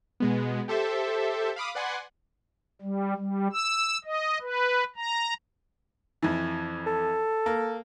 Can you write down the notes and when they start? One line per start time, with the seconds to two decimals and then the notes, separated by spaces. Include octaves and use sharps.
0.20 B2 G#3 B3
0.68 G4 A4 C5 E5
1.56 F5 B5 D6 D#6
1.75 B4 D5 F#5 G#5 C6
2.82 G3
3.17 G3
3.53 E6
4.04 D#5
4.41 B4
4.96 A#5
6.22 F2 E3
6.87 A4
7.46 A#3